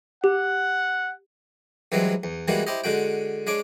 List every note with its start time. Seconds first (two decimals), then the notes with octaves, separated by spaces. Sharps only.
0.24 G4 F#5
1.92 G2 E3 F#3 G#3 C4
2.24 E2
2.48 E3 G3 G#3 A#3 F#4
2.67 E4 G4 C5 D#5
2.84 D3 G#3 F#4 G5
3.47 G#3 D4 C#5 D6